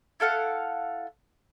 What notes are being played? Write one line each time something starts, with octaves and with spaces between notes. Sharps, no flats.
E4 A4 F5 F#5